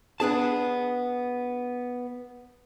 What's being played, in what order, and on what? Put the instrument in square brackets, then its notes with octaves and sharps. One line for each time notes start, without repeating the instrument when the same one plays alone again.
[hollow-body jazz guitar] B3 D4 G#4 A5